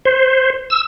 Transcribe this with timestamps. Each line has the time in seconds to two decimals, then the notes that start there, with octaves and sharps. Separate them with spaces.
0.05 C5
0.70 E6